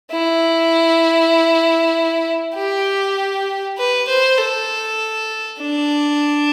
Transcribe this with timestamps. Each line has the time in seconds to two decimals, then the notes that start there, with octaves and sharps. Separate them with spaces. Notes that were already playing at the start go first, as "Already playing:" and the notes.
0.11 E4
2.55 G4
3.78 B4
4.08 C5
4.38 A4
5.61 D4